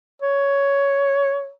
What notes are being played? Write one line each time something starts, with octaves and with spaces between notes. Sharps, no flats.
C#5